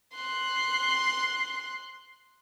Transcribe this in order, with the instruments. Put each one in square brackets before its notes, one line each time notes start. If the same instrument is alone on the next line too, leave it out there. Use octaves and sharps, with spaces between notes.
[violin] C6 F#6